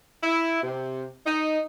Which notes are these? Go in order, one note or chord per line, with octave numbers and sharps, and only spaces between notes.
E4
C3
D#4